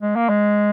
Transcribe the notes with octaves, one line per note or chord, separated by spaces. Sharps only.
G#3
A#3
G#3